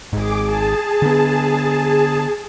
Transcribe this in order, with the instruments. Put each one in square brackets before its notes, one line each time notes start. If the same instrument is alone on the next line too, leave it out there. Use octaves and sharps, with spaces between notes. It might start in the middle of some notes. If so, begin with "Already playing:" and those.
[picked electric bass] G#1 G#2 [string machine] G#4 D6
[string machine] G#4 A5
[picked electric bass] D3 B3